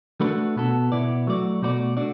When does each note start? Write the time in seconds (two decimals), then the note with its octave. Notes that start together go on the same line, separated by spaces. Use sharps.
0.21 A3 D4 F#4 B4
0.56 B2 B3 F#4 A4
0.92 B2 B3 E4 D5
1.27 F#3 A3 F#4 D5
1.62 B2 A3 F#4 B4 D5
1.97 A3 D4 F#4 D5